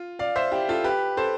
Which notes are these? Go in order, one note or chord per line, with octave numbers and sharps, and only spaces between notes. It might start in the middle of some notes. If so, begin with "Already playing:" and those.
Already playing: F4
D5 F5
C5 E5
E4 G4
F4 A4
G4 B4
A4 C5